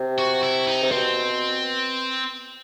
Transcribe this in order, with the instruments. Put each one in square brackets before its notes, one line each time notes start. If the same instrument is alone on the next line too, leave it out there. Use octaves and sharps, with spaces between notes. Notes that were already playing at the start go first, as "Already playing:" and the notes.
Already playing: [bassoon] C3
[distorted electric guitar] F#4
E4
D#4
[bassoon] C3
[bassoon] B2 [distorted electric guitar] C4